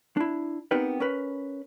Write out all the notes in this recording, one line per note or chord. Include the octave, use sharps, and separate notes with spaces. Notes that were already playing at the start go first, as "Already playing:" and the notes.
D4 E4
B3 C4 D#4 G4 A#4 B4
C#4 A#4 B4